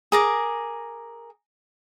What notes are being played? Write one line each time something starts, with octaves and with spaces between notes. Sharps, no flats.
G#4 A#4 D6